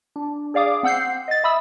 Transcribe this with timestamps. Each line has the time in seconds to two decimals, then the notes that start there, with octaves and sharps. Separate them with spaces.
0.16 D4
0.54 G#4 D5 F5 D6 D#6
0.83 C4 F#5 E6 G6 C7
1.28 D#5 A6
1.44 E5 B5 D#6 E6